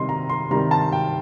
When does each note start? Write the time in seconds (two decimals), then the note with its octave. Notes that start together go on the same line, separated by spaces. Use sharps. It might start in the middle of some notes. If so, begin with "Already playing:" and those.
Already playing: C3 D#3 G3 D#5 C6
0.09 A#5
0.29 C6
0.51 C3 D#3 G3 A#5
0.71 A5
0.92 G5